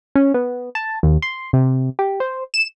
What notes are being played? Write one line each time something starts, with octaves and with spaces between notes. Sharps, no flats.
C#4
B3
A5
D#2
C6
C3
G4
C5
E7